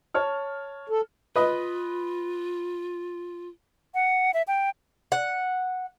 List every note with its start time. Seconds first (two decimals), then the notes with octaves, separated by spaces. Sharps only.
0.14 C#5 A5 F6
0.90 A4
1.36 F4 B4 D#5
3.94 F#5
4.34 E5
4.48 G5
5.12 F#5